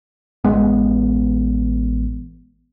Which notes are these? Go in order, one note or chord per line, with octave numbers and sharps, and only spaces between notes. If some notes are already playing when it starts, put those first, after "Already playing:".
A1 G#3 B3